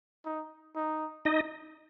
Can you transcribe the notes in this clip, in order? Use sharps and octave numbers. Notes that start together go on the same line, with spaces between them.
D#4
D#4
D#4 D#5